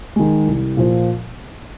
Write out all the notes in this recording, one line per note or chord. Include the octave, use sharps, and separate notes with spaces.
D#3 G#3
C2
A#2 F3